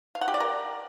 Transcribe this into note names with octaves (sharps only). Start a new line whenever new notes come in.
F5
F#5
G4
D5
A#4